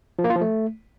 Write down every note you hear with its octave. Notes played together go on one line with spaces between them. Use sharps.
F3
A#3
F4
F3
A3